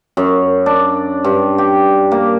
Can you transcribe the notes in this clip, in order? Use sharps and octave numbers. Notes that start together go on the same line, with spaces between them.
F#2
D4
G2
G4
A#3